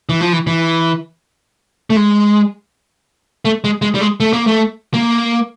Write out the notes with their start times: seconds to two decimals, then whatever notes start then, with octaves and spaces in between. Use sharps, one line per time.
0.09 E3
0.21 F3
0.32 E3
0.47 E3
1.90 A3
1.96 G#3
3.45 A3
3.64 G#3
3.82 G#3
3.95 G3
4.01 G#3
4.20 A3
4.33 A#3
4.47 A3
4.94 A#3